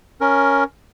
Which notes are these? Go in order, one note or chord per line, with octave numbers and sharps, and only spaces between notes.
C#4 A#4